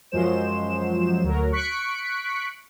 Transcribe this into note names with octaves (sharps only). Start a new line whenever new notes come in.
F#2 F3 F#3 G#3 C5 E7
D2 F#3 A#4
C#6 F#6 B6 C#7 D7